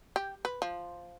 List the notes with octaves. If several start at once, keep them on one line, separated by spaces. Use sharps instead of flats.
G4
B4
F3